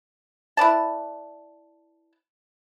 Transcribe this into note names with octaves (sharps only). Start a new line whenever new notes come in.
E4 B4 D5 A5